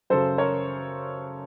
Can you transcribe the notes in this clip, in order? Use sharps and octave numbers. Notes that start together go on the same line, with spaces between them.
F#2 C#3 A4 C5
A#4 C#5